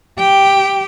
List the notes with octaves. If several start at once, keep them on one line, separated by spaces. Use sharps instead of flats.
G4 G5